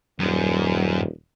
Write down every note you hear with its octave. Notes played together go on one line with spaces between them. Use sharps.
D#1 F#2